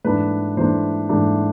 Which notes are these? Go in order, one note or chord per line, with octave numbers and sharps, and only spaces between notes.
G#2 E3 A3 D4 B4
G#2 E3 A3 D4 C5
G#2 E3 A3 D4